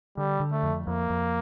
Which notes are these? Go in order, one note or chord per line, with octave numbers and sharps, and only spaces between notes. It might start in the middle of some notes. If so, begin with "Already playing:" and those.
D3 G3
D3
A3
F2
F2 A#3
F2